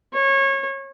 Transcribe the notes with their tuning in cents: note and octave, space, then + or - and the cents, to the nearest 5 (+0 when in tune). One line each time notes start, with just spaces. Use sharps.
C#5 -25